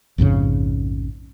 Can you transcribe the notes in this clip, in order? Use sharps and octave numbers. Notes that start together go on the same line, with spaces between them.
A#1 F2 G#2 C#3